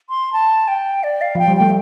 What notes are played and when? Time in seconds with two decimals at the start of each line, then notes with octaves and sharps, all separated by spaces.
0.10 C6
0.33 A5
0.68 G5
1.04 D5
1.21 F5
1.35 F3 G5
1.48 G3
1.57 A3 G5